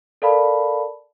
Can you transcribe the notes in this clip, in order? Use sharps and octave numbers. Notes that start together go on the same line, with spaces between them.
A4 A#4 D5 F5 A5 B5